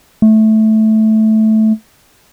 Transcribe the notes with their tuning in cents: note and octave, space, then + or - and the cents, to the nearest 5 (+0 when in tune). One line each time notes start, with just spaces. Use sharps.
A3 -10